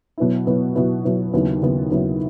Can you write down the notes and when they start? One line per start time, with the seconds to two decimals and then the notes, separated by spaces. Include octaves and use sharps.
0.18 B2 F#3 B3 E4
0.47 B2 F#3 B3 E4
0.75 B2 F#3 B3 E4
1.04 B2 F#3 B3 E4
1.33 D#2 C#3 F#3 B3 E4
1.62 D#2 C#3 F#3 B3 E4
1.91 D#2 C#3 F#3 B3 E4